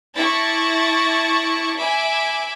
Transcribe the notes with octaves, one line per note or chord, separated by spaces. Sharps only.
E4 A5 C#6 D6 A6 A#6
E5 G#5 B5 D6